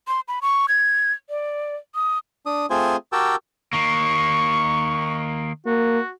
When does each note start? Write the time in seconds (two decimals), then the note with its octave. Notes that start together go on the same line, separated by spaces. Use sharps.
0.08 C6
0.28 B5
0.42 C#6
0.69 G#6
1.29 D5
1.95 D#6
2.46 D4 D#6
2.70 A3 C4 F4 G#4 C5 G#5
3.13 F#4 G4 A#4 G5 A5 E6
3.73 D#3 A#3 C#6
5.66 A#3 F#4